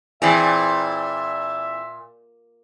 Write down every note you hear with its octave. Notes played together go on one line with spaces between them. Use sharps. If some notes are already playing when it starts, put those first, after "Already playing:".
A#2 E3 C4 G#4 E5